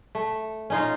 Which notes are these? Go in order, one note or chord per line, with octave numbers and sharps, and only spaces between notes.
A3
C#4 D#4 F4